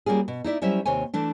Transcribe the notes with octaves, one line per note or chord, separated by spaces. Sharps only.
G3 A#3 C#4 F4 G#4
B2
D#4 E4 D5 E5
F#3 G3 C#4 E4 C5 E5
D#2 C3 C5 C#5 G#5
E3 A3 D4